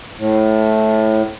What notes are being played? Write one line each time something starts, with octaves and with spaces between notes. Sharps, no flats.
A2